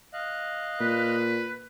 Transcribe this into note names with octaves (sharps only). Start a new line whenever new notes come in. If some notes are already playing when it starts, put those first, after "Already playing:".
D#5 F5 F#6
A#2 B4